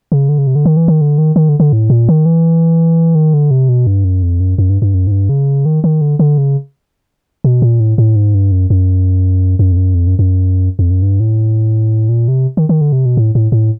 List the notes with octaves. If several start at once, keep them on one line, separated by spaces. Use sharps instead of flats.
C#3
D3
C#3
C3
D3
D#3
E3
D#3
D3
D#3
D#3
D3
D3
A2
A#2
D#3
E3
D#3
D3
C3
B2
G2
F#2
F2
F#2
F#2
G2
G2
F#2
G#2
G2
C#3
D#3
D#3
D3
D3
C#3
B2
A#2
A2
A2
G#2
G2
F#2
F#2
F#2
F2
F#2
F2
F#2
F#2
F2
F#2
G2
A2
A#2
C3
D#3
D#3
D3
C3
B2
A2
A2
A2